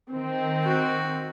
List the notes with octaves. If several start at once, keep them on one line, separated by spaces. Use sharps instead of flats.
D#3 C4
F#4